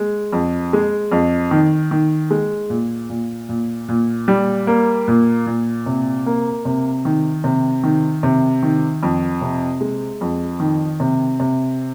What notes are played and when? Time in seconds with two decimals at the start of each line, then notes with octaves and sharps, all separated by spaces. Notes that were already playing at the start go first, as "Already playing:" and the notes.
Already playing: G#3
0.33 F2
0.73 G#3
1.12 F2
1.51 D#3
1.91 D#3
2.30 G#3
2.70 A#2
3.10 A#2
3.49 A#2
3.89 A#2
4.28 G3
4.67 A#3
5.08 A#2
5.46 A#2
5.86 C3
6.26 A#3
6.65 C3
7.05 D#3
7.44 C3
7.83 D#3
8.23 C3
8.63 D#3
9.03 F2
9.42 C3
9.81 G#3
10.21 F2
10.60 D#3
11.00 C3
11.40 C3